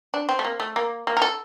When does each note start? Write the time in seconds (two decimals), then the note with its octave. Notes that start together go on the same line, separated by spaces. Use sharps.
0.14 D4
0.29 C4
0.39 A3
0.45 A#3
0.60 A3
0.76 A#3
1.07 A#3
1.17 A#4
1.22 A4